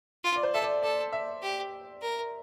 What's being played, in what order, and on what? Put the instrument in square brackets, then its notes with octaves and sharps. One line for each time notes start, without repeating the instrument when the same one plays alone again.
[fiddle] F4
[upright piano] D5
C5
[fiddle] A4 [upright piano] E5
[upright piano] D5
[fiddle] A4 [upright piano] D5
[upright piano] E5
[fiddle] G4
A#4